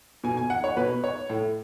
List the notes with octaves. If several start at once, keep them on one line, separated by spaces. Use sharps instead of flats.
B2 G#5
G#5
F#5
C#5
B2 B4
C#5
A2